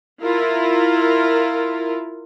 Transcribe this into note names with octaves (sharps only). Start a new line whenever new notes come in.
E4 F4 A#4